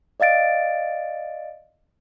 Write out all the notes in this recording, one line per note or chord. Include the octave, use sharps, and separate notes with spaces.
D5 D#5 F5 A6 D7